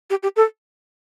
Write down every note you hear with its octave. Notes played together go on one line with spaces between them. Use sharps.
G4
G4
A4